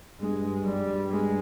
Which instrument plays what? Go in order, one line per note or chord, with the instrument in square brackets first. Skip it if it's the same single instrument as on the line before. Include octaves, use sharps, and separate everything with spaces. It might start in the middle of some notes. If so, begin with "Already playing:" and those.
[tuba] G2 [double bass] G#3
[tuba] G2 [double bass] G3
[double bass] G#3